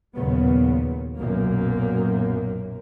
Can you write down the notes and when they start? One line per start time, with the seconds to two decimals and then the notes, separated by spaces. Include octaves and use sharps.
0.14 D#2 A#2 C#3 F#3 B3
1.18 B1 F#2 A#2 A#3